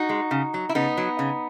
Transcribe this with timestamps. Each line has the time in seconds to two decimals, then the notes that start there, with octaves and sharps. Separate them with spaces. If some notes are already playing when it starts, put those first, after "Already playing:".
Already playing: D#4 F#4
0.09 G#3
0.31 C#3
0.54 F#3
0.69 E4
0.75 C#3 B3 D#4
0.97 F#3
1.19 C#3